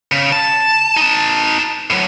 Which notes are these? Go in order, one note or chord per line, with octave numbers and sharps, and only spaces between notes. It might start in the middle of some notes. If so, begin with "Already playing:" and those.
C#3
A5
D#4 A5
A2 F#3